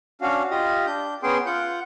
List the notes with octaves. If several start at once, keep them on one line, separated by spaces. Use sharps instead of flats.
C#4 D4 F#4 F5
F4 G4 D#5
D4 G6
B3 C#4 G#4 G5 C6
F4 F#5 G6